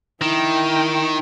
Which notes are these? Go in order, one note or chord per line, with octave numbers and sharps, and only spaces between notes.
D#3 E4 G5